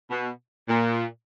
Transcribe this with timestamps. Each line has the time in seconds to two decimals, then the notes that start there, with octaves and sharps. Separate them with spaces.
0.11 B2
0.69 A#2